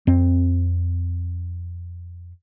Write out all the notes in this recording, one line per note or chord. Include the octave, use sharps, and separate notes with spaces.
F2 C4